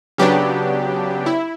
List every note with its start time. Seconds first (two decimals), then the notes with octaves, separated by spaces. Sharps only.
0.18 C#3 F#3 B3 D4 G4
1.26 E4